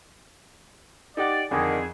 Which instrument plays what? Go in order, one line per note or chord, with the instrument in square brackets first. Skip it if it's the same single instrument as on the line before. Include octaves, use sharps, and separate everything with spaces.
[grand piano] D#4 G4 F#5 [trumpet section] D5
[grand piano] F2 [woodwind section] D3 D#3 [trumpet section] G#4